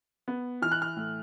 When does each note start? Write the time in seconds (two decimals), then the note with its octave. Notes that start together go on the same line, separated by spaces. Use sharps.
0.28 B3
0.62 E3 F6
0.72 F#6
0.82 F6
0.96 A2